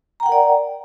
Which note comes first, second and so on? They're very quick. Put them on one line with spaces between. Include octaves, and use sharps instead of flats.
A#5 G5 F#5 A#4 D5